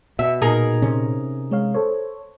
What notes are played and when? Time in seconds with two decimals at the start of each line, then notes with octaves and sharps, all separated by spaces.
0.19 B2 E5
0.42 A#2 D#4 G#4 A#4
0.82 C3 C#4
1.51 G#3 C#5 F5
1.75 A4 C5 C#5